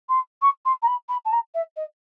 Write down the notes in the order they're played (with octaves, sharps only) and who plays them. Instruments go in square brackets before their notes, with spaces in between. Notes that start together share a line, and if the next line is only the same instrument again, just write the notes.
[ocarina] C6
C#6
C6
A#5
B5
B5
A5
A#5
E5
D#5